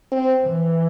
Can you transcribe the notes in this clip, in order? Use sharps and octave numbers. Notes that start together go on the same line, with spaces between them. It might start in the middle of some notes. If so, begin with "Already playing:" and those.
C4
E3